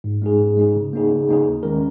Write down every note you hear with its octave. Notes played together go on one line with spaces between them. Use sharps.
G#2
G#3 D#4 G#4
G#2
G#3 D#4 G#4
C#3
A#3 D#4 G#4
C#3
A#3 D#4 G#4
D#2
D#3 G#3 C#4 A#4